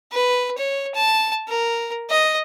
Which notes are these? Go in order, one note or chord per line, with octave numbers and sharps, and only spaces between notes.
B4
C#5
A5
A#4
D#5